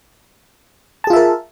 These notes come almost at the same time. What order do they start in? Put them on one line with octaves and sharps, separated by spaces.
A5 G#4 F4 E5 A#4